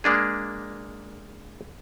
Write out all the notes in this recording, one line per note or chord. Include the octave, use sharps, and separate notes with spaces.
G#3 A#3 D4 G#4